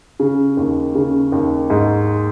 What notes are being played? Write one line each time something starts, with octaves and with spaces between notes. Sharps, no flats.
C#3
D#2
C#3
D#2
G#2